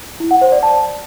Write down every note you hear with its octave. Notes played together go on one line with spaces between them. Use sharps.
E4
F#5
C5
D5
A5